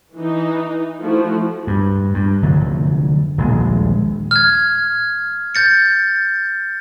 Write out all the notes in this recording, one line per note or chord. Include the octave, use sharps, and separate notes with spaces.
E3 D#4
F3 A3 E4 F#4
G2
G2
F1 D3 F#3 A3
D#1 A#1 G#3
F6 G#6
G6 A6 C#7